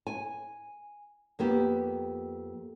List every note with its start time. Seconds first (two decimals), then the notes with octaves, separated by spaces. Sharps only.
0.07 G#5
1.39 F2 A#3 B3 G4